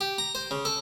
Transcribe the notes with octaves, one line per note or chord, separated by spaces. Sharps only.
G4
A#5
C5
C#3
A4